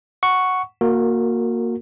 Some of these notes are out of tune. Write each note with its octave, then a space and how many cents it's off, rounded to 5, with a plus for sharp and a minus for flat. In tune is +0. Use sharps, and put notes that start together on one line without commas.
F#5 +0 C#6 +0
A#3 +0 F#4 -20 A#4 -20